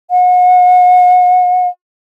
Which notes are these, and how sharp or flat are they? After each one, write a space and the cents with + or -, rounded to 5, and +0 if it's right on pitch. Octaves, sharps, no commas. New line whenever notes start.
F#5 -35